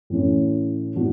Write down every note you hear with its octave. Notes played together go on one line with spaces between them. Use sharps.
A2 E3 A3 C#4
A2 E3 B3 D4 F#4